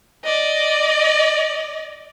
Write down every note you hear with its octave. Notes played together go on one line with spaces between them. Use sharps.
D5 D#5